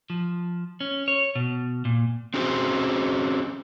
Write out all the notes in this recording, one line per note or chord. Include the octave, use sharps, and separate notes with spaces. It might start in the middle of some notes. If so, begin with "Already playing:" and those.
F3
C#4
C#5
B2
A#2
C4 C#4 F#4 G#4 C5